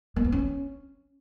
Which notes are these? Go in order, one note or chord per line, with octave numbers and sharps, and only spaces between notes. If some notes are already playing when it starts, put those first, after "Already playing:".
A#3
B3
C#4